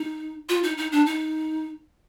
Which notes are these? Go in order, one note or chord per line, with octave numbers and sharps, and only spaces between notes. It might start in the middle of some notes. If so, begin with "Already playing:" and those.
Already playing: D#4
F4
D#4
D#4
D4
D#4